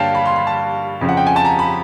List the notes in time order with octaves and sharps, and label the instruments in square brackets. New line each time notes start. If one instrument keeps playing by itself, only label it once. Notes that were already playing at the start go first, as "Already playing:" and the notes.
Already playing: [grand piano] G2 D3 G3 A#3 C#5 F5 G5 A5
B5
C6
B5
A5
F2 C#3 F3
F#5
G5
G#5
A5
A#5
B5